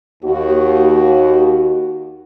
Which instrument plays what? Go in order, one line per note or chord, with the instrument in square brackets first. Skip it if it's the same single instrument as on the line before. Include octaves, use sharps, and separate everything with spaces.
[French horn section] D#2 F#4